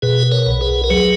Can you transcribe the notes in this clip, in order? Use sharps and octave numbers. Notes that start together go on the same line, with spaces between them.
B2 G#4 B4
A#4 C#5
B1
G#4 B4
A#4
F#3 G#4 B4